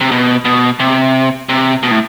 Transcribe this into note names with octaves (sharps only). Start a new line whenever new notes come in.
C3
B2
B2
C3
C3
B2
A2